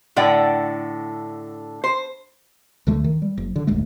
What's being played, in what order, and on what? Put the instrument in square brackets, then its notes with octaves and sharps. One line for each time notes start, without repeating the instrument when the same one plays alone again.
[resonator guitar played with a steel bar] A2 D3 D5 F#5 G5
C5
[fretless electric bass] D2 D3 A3
D#3
G3
F#1
D3
D#1 G#1 D2 A3